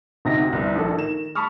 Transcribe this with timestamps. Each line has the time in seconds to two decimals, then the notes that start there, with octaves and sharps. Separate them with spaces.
0.25 D2 C3 D#4 E5 A#6
0.52 G1 C2
0.76 A#1 A4
0.97 D#3 E7
1.35 A5 B5 C#6 D#6 F6